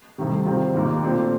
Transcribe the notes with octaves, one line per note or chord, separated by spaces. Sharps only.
C2 C3 D#3 A3
C3 D#3 G3 C4 F4
D#2 D#3 A#3 D#4
A#2 A3 C4 F4